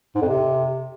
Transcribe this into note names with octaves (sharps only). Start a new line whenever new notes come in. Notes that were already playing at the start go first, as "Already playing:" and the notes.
G#2
F2
C3